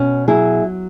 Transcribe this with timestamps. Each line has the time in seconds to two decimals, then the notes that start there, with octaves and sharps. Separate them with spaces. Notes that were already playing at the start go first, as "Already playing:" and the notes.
Already playing: B2 C#4
0.28 F#3 E4 G#4